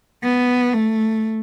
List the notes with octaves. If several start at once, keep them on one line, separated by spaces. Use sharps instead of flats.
B3
A3